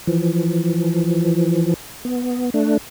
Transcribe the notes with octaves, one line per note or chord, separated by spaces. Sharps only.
E3 F3
B3
A3 D4